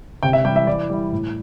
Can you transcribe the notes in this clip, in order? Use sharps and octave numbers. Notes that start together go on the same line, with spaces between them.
C3 G5
E5
G3 G5
E3
E5
E3 D5
G3 E4
A2